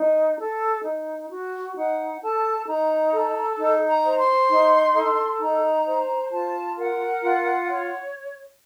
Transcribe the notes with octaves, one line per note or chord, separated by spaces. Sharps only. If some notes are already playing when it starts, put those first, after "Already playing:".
Already playing: D#4
A4
D#4
F#4
D#4 F#5
A4 A5
D#4 A#5
A4
D#4
A#5
C5
C6
D#4
A4
D#4 A#5
C5
F4 A5
A#4 F#5
F4
C#5